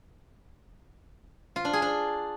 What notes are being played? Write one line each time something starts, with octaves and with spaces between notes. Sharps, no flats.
F4
D4
G#4
D4